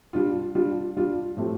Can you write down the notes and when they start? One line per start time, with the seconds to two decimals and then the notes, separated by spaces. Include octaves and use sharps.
0.13 G3 D4 F4
0.55 G3 D4 F4
0.97 G3 D4 F4
1.37 A2 F3 A3 C4 G4